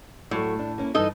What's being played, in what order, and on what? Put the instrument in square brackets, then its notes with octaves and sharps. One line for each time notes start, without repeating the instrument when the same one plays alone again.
[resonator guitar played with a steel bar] A2 [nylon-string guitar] F#3 A3
[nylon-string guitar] D4
A#3 C#4 E4
[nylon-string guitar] G2 E3 [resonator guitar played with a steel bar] D#4 A4 D#5